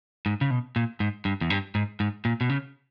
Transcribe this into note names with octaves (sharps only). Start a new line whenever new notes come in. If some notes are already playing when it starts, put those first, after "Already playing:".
G#2
C#3
B2
A#2
G#2
G2
E2
G2
G#2
G#2
A#2
B2
C#3